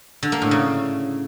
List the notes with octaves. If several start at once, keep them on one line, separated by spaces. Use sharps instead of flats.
D3
A#3
A2
C#3